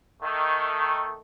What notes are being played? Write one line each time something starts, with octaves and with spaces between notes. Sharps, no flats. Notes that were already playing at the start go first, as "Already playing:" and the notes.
D#3 A3